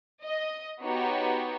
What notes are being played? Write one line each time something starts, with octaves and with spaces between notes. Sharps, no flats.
D#5
B3 D#4 F#4 G4 C#5